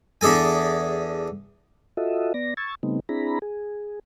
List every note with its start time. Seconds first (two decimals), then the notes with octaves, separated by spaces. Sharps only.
0.21 E2 D4 G#4 A4 G#5
1.97 F4 F#4 A4 D#5 E5
2.34 B3 D5 A#6
2.57 C#6 E6 G#6 A6
2.83 C#3 G3 A3 B3 C4 D#4
3.09 C4 D4 E4 G#4 A#5 B5
3.42 G#4